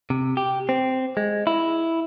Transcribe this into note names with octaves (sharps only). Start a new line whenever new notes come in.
C3
G4
C4
G#3
E4